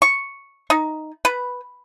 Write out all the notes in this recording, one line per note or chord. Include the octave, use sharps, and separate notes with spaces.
C#6
D#4
B4